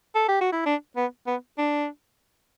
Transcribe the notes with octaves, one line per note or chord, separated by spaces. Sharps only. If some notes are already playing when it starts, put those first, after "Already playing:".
A4
G4
F#4
E4
D4
B3
B3
D4